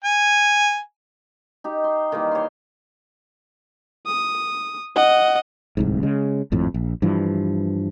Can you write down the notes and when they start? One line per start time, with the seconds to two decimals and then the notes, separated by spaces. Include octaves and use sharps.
0.04 G#5
1.64 D#4 G4
1.84 C6
2.12 D#3 E3 G3 A#3
2.31 C#5 C6
4.06 D#6
4.96 D#5 F#5
5.77 D1 C2 G#2
6.03 C#3 G#3
6.52 G#1 F2 A2
6.74 A#1
7.02 G2 E3 F3